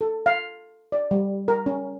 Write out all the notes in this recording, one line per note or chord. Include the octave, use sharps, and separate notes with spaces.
A4
F5
D5
G3
A#4
C#4